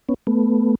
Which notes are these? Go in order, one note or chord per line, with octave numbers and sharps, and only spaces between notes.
B3 C#4
A3 B3